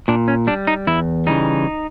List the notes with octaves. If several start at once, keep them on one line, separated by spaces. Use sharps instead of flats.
A#2 D4
C#4
G3 D4
D#4
E2 E4
C#3 E3 G3 D#4